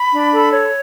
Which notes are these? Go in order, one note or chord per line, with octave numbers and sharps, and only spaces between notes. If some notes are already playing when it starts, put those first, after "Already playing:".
Already playing: B5
D4
A4
C#5